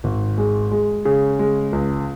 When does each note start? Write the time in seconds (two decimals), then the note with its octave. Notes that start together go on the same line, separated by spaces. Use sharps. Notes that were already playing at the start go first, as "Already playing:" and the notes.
0.04 G#1
0.38 G#3
0.71 G#3
1.05 C#3
1.39 G#3
1.73 C#2